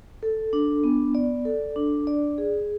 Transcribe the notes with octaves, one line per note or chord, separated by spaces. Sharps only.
A4
D4
B3
D5
A4
D4
D5
G#4